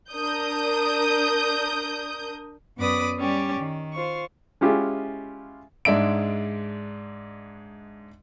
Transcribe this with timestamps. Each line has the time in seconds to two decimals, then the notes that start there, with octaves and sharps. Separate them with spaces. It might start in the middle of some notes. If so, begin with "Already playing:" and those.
0.12 D4 A#4 D#6 G6
2.78 F#2 B3 B4 D5 D6 D#6
3.19 G3 C#4 G4 D5
3.59 D#3
3.93 F4 C5 C#6
4.61 G#3 C#4 E4 F4 G4 E5
5.85 G#2 G#3 D4 E5 D7